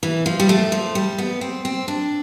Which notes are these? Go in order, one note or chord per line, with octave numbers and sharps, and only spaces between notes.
E3
F3
G3
A3
F3
G3
B3
C4
C4
D4